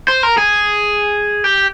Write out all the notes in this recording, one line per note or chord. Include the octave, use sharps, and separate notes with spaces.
C5
A#4
G#4
G4